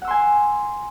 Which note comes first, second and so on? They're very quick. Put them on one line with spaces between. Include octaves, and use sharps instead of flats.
F#5 E6 C6 G#5